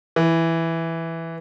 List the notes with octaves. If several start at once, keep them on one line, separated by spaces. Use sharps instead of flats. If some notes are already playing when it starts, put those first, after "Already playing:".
E3